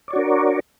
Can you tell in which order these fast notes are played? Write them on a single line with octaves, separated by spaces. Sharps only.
D5 C#5 F#4 D4 A#4